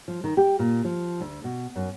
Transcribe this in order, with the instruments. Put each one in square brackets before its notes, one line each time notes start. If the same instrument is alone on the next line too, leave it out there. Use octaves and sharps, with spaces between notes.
[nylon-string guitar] F3
D#3
G4
A#2
F3
D2
B2
F#2